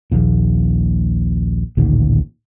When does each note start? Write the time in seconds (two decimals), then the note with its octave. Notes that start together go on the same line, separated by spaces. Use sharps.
0.12 A#1 D#2 A#2
1.77 A1 D2 A#2 D#3